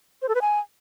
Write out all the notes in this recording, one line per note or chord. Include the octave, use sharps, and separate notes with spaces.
C5
A4
B4
G#5